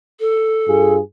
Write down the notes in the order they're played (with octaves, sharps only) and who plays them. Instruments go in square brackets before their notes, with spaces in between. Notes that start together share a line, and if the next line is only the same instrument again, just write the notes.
[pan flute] A4
[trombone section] G2 F4 G#4